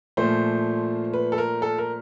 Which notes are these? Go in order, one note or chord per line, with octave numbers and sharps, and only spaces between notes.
A#2 F3 A3 C5
B4
A4
A#4
A4
A#4